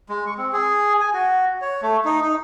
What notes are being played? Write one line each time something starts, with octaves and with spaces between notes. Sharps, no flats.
G#3
C#6
C4
G#4
G#5
F#4
C#5
A3
D#4
D#4